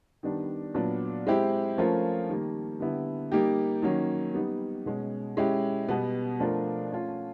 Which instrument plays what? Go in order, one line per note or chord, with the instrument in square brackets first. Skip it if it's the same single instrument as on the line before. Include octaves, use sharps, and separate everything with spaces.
[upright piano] D#3 G3 B3 D4
A#2 F#3 B3 D4
G#3 C4 E4 G4
F3 A3 C#4 F4 A#4
D#3 G3 A#3
D3 G3 B3 E4
G3 A#3 D#4 G4
D#3 F#3 A#3 C#4
G3 B3 D#4
B2 G#3 C#4
G#3 C#4 E4 G4
B2 G3 B3
F3 A3 D4 F4 A#4
A3 C#4 F4